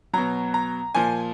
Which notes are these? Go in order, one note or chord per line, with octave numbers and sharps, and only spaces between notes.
B2 F#3 A#5
A#5
A#2 F3 G#5